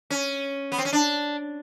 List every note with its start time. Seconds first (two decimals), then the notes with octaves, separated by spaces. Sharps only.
0.10 C#4
0.72 B3
0.78 C4
0.85 C#4
0.93 D4